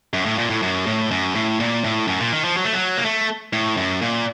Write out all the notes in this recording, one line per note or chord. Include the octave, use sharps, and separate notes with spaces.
F#2
A2
A#2
A2
F#2
A2
F#2
A2
A#2
A2
F#2
A#2
D#3
F3
F#3
A3
F#3
A#3
A3
A2
F#2
A#2